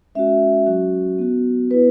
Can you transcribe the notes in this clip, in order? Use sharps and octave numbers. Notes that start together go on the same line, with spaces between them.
G#3 C#4 F#4 E5
F#3 C#4 F#4
B3 F#4
B3 E4 B4